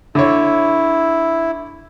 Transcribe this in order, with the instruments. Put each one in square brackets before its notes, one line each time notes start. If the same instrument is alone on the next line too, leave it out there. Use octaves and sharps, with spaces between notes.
[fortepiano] D3 C#5 [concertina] E4